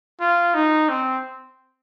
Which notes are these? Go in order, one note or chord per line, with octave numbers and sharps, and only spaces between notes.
F4
D#4
C4